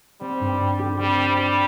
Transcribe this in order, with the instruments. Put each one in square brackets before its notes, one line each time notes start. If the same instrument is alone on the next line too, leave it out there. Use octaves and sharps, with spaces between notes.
[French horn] G3 [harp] C4
[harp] G2
C4
G4
[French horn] G3 [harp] C4
[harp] C4
[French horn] G3 [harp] G4